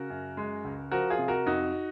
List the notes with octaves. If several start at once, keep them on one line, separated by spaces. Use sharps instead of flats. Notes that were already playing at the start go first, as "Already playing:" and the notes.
Already playing: C#3 F#4 A#4
F#2
G#3
C#2
F3 F#4 A#4
F4 G#4
C3
F#4 A#4
F2 D#4 F#4